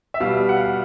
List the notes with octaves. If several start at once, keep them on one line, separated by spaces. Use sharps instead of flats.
E5
B2 G3 F5
F#5
F5
F#5